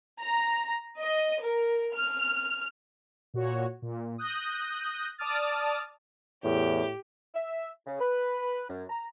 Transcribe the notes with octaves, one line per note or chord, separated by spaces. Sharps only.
A#5
D#5
A#4
F6
A#2 F#4 C#5
A#2
D#6 F#6 G6 A#6
D5 A5 D6 D#6 F6 A6
E2 A2 G4
E5
C#3
B4
F#2
A#5